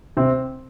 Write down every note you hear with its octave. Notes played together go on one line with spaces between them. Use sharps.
C3 C4